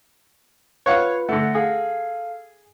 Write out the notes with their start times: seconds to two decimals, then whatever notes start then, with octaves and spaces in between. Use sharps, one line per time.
0.86 F4 B4 C#5 F5 F#5
1.29 D3 A3 F#5 A#6
1.55 G#4 A4 F5